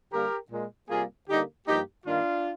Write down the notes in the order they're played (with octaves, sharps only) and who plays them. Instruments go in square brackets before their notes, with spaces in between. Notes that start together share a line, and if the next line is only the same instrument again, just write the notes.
[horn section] D3 G3 A#3 G4 A#4
A#2 G#3
C3 G3 A#3 F4 G#4
D3 G3 A#3 D#4 G4
G2 F3 A#3 D#4 G4
G2 D#3 A#3 D4 F4